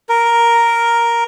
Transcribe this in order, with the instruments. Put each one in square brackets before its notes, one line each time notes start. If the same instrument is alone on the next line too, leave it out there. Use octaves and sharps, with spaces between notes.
[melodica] A#4